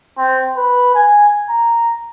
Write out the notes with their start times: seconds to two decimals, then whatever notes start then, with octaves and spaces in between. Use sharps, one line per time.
0.18 C4
0.57 B4
0.95 G#5
1.50 A#5